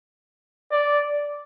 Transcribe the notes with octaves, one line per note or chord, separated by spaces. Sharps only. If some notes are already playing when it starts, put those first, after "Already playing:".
D5